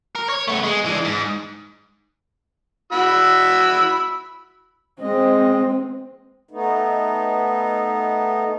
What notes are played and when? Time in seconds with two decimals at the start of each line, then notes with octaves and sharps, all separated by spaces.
0.15 A#4
0.29 C#5
0.48 A3 B3
0.64 G#3
0.86 E3 D4
1.05 G#2
2.93 F#4 B5 E6
5.01 G#3 C4 D#5
6.51 A3 B3 D#4